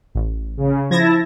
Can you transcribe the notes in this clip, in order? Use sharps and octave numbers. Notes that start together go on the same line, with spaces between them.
A1
C#3
F3 E4 A5 G#6 A#6